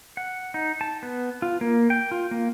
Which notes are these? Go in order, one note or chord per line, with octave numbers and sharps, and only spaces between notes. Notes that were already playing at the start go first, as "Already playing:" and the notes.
F#5
D#4
A5
B3
F4
A#3
G5
F4
A#3